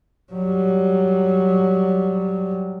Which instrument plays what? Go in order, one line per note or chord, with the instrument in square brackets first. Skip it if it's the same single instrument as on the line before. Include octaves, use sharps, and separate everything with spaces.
[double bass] F#3 G3